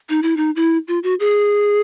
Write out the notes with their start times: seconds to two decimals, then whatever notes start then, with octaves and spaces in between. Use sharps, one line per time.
0.09 D#4
0.23 E4
0.37 D#4
0.56 E4
0.88 F4
1.03 F#4
1.20 G#4